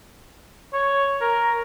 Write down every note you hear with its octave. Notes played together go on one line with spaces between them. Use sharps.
C#5
A#4